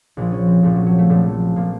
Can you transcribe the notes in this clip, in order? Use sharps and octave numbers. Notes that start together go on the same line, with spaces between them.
A#1 A#2 F3
C#4
C4
A#1 A#2 F3 A3
F#3
F#3
A3
A#1 A#2 F3 A3
A#2 F3 A#3